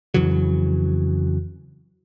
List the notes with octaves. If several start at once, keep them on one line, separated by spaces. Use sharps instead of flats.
F2 C#3 E3 F#3